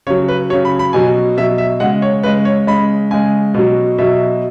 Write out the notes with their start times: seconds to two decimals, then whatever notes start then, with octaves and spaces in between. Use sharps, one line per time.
0.07 C#3 C#5
0.10 F#3
0.28 B4
0.50 F#3 C#5
0.53 C#3
0.65 B5
0.79 B5
0.93 B2 F#3 G#5
1.37 B2 F#3 E5
1.58 E5
1.80 C#3 G#3 F#5
2.02 C#5
2.23 C#3 G#3 B4
2.45 C#5
2.67 C#3 G#3 B5
3.11 C#3 G#3 G#5
3.54 B2 F#3
3.98 B2 F#3 E5